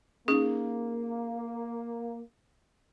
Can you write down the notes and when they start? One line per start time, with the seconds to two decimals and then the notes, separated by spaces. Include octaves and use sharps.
0.28 A#3 C#4 D#4 G#4